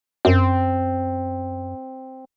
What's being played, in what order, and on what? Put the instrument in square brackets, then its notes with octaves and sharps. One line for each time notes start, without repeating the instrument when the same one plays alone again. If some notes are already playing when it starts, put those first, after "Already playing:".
[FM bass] F#2 [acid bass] C4